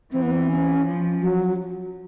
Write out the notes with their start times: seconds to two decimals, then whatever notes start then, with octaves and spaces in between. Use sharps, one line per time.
0.12 E3 C4
0.22 B3
0.31 C4
0.49 C#4
0.85 F3
1.21 F#3